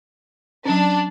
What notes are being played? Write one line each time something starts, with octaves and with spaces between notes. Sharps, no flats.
F#3 C#4 D4